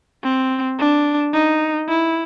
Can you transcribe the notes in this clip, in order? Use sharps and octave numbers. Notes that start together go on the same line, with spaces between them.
C4
D4
D#4
E4